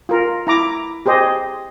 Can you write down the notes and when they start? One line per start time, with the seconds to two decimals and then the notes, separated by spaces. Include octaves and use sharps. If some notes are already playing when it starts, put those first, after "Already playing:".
0.09 F4 A#4
0.47 E4 A#5 D6
1.06 G4 G#4 C5 D#5